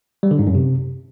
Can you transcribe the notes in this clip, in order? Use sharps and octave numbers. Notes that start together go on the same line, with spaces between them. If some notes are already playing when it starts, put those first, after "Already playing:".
G3
D3
G#2
F#2
C3